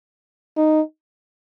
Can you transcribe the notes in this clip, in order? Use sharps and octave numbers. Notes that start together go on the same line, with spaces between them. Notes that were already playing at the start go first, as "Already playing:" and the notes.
D#4